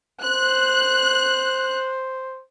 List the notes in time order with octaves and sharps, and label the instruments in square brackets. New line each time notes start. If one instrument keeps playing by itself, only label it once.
[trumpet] C5 [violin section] F#6